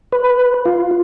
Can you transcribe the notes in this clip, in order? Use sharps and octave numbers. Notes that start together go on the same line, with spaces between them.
B4
F4